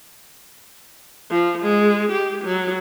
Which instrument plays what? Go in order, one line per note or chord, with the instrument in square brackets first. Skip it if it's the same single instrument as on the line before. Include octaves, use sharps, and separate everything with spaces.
[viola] F3
G#3
G4
F#3